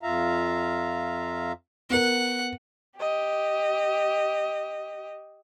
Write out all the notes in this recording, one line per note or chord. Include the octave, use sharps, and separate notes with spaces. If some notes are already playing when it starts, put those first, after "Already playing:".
F2 F4 E5 F5 A#5
B3 A#4 F#5
G4 D#5